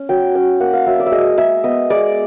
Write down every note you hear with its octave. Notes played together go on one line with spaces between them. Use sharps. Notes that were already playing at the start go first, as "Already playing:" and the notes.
Already playing: C#4
F#3 G5
C#4 G5
A#3 F#5
F5
F#3 E5
D5
E5
G#3 D#5
G#3 E5
B3 D#5
G#3 D5